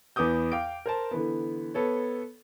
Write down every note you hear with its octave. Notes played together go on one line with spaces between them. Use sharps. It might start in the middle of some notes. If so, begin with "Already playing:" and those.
E2 B3 D6 D#6 G6
F5 G5 D6 D7
A#4 C5 A5
D3 E3 B3
B3 A4 C#5